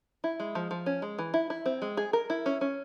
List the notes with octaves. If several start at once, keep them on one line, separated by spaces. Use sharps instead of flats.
E4
G#3
F3
F3
C#4
G#3
E3
E4
E4
C4
G#3
G#4
A#4
E4
C#4
C#4